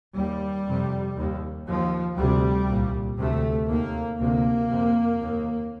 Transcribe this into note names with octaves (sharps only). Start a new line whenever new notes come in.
D#2 G3
F2 C3
D#2
D#2 F3
D2 C3 G3
C2 A#2
D2 C3 A3
D#2 A#3
D2 C3 A#3
F2 C3
D#2